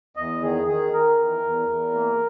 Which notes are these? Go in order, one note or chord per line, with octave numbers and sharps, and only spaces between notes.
E2 D#5
D#3 G#4
D#3 G#4
D#3 A#4
E2
E2
E2
A#3